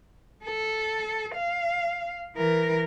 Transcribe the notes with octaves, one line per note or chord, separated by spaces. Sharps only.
A4
F5
E3 A#4